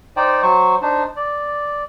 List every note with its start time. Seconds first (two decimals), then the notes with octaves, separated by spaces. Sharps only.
0.16 D#4 C5 D5 G5
0.42 F#3 C5 C#6
0.82 D4 D#4 C5
1.16 D5